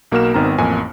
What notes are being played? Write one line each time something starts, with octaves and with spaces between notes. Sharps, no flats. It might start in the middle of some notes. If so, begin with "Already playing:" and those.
B1 A#3 F#4 A#4 F6 E7
G#1 D#3 B3 C4 A#5
A1 F2 A#3 G#5